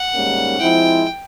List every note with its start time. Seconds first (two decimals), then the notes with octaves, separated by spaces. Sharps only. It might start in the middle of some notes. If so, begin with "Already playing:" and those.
Already playing: F#5
0.15 G#2 D#3 G3 A#3 C#4
0.59 F3 G#3 C4 E4 G5